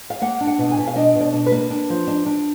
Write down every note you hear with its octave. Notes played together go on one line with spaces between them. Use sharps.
F5
A#3 F#5
D4
F#5
B2
G#5
B2
F5
D4 D#5
B2
D5
D4
B4
A#3
D4
F3
D4
D4